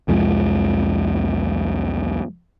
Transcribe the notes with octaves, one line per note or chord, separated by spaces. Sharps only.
C2 F2 F3 G#3